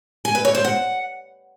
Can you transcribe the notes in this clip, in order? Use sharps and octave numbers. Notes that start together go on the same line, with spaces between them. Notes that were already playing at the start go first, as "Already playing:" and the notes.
G#5
B4
C#5
C5
F#5